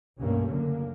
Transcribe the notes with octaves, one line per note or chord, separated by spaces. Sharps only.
C#2 G2 B2 A3 A#3 C#4
C#2 F#2 D3 A#3